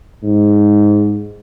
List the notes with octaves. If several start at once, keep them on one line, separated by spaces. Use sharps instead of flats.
G#2